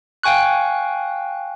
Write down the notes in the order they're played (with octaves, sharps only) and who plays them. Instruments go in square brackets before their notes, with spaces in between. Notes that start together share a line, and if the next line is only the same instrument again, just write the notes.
[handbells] F5 G5 G#5 C#6 F#6